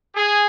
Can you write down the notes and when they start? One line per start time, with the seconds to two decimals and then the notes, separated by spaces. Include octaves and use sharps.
0.14 G#4